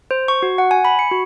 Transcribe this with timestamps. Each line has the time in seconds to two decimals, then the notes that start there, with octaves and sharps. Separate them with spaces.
0.11 C5
0.28 C#6
0.43 F#4
0.58 F#5
0.71 G#5
0.85 B5
0.99 C#7
1.11 F#4